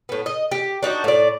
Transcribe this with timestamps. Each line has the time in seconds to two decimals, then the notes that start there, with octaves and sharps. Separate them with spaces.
0.09 A2 B3
0.26 D#5
0.51 G4
0.83 D4 D#4 F#4
1.04 A2 D5